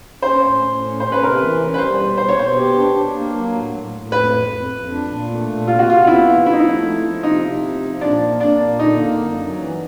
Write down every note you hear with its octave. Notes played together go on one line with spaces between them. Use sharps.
C#4 C5
A2
A2
C#4
C#4 C5
B4
C3 A#4
B4
E3
C#4
B4
G3 C5
B2
B2 C5
C#5
B2 C5
G4
D4
D4
A#3
F#3
A2
A2
A2
F2 B4
F2
F2
F2
D4
A#2
A3
A#2
C3 F4
F#4
C3 F4
B3 E4
F3
F3 E4
D#4
A3 E4
F3
F3
C3 D#4
C3
F3
F3
A#2 D4
A#3
A#3 D4
A#2
D3 D#4
A#3
F#2
F#3
E3